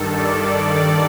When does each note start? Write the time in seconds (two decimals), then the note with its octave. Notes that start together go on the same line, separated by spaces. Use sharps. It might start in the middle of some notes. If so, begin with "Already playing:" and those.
Already playing: G2 D#3 A4
0.15 D5